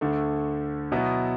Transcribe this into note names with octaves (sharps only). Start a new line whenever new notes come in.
D2 D3 A3
B2 F#3 B3 E4